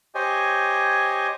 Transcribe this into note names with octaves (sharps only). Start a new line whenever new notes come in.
G4 C5 C#5 D#5 G#5